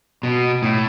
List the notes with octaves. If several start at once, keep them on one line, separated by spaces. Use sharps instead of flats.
B2
A2